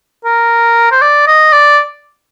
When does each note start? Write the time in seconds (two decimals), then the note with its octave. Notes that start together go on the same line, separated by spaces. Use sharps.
0.25 A#4
0.91 C5
1.01 D5
1.27 D#5
1.52 D5